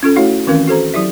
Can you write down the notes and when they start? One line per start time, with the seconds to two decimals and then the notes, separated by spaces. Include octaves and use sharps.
0.03 C#4 F4 A4
0.16 A3 E4 F#4 C#5 F5 F#5
0.47 D#3 E3 C4 C#4 A#4 F5
0.68 F#4 A4 C5 A#5
0.94 F#3 E4 G4 E5